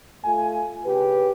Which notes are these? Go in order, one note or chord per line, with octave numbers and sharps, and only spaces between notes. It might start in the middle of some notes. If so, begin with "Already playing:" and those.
A3 F4 G#5
C#3 G4 B4